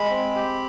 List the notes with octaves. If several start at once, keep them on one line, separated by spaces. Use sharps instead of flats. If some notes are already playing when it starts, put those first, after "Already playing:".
Already playing: G#3 B5
C4
G4